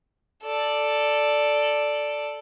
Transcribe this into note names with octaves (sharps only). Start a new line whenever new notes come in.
A4 D5